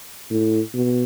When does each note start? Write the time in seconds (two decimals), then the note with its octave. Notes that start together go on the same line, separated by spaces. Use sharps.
0.30 A2
0.74 B2